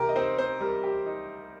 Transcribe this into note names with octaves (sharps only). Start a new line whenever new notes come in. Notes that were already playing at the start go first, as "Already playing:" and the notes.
Already playing: C2 G4 A#4
D#5
C4 D#4 C5
C4 C5
G3 A#4
G4
D#4